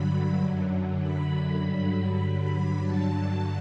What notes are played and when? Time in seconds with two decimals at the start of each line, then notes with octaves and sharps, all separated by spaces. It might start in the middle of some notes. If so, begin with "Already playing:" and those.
Already playing: G2 D3 F#3 B5
0.40 F#2 D3 F#3
1.01 B5
1.60 G2 D3 F#3 B5
2.50 B5
2.79 G2 D3 F#3 A5